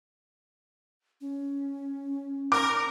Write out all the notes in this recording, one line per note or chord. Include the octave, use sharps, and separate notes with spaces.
C#4
A#4 D6